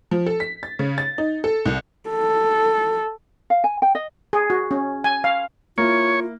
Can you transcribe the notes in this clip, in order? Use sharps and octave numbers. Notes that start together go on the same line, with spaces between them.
F3
A4
B6
A6
C#3
A6
D#4
A4
C2
A4
F5
G#5
G5
D#5
G#4
F#4
C#4
G#5
F5
A#3 E4 F4 C#5